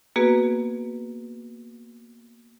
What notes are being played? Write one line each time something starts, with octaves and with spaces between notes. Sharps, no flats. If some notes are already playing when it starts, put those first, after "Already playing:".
A#3 B3 F#4 G#4 B4